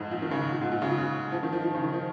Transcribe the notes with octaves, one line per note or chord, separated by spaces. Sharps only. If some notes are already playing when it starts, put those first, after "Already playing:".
Already playing: F2 G#2
A#2
D#3
C#3
A#2
G#2
A#2
C#3
A#2
C#3
F3
D#3
F3
F3
C#3
D#3
F3